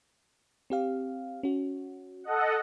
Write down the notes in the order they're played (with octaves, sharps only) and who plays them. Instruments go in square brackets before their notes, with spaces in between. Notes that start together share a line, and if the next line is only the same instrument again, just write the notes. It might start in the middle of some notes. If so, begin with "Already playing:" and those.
[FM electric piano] C4 G4 F5
C#4 F#4
[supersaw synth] A4 D#5 F#5